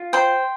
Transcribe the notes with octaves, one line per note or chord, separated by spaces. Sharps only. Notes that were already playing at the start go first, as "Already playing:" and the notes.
Already playing: F4
C5 G5 C6